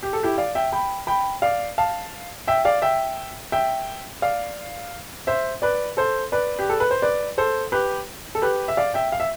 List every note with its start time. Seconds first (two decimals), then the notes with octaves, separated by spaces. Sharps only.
0.03 G4
0.13 A4
0.23 E4 G4
0.38 D5 F5
0.55 E5 G5
0.72 G5 B5
1.07 G5 B5
1.42 D5 F5
1.78 F5 A5
2.48 E5 G5
2.65 D5 F5
2.82 E5 G5
3.52 E5 G5
4.22 D5 F5
5.27 C5 E5
5.62 B4 D5
5.97 A4 C5
6.32 B4 D5
6.59 G4
6.69 A4
6.80 B4
6.91 C5
7.02 B4 D5
7.38 A4 C5
7.72 G4 B4
8.35 A4
8.42 G4 B4
8.68 E5
8.77 D5 F5
8.94 E5 G5
9.12 F5
9.20 E5